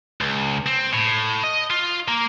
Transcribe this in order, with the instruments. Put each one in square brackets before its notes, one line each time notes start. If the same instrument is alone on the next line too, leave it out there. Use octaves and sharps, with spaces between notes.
[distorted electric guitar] C#2
C4
A2
D#5
F4
A#3